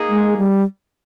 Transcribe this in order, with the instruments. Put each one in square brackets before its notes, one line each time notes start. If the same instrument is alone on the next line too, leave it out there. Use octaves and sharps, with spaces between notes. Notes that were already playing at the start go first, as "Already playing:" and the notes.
Already playing: [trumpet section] A#3 D#4 G#4
[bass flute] G#3
G3